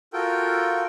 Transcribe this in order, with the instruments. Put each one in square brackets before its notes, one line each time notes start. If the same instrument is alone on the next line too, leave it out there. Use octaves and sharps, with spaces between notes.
[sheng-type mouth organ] F4 F#4 A4 A#4 G5